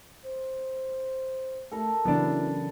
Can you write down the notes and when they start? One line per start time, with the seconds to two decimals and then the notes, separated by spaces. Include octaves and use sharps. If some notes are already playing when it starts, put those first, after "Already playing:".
0.24 C5
1.71 A3 A4 A#4
2.05 C#3 E3 F#3 B3 D4 E4